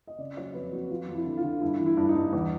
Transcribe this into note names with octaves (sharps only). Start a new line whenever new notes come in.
D#5
C#3 D5
F#3 C#5
F2 B4
F2 F#4
F2 F4
F2
E4
D3
F4
D3
G2 E4
E3
E4
G2
D#4
G2
E2